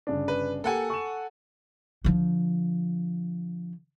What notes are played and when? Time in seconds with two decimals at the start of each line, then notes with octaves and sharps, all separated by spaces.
0.07 G1 C#3 D4
0.28 B4
0.64 A#3 G4 A4 F#5 G#5
0.90 C#6 E7
2.04 D3 F3